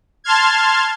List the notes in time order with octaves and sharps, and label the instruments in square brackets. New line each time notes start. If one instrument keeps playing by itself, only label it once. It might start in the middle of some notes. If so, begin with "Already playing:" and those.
[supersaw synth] A5 C6 F6 G#6